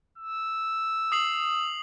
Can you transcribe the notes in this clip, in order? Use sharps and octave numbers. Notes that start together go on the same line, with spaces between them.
E6
D#6 C7 F#7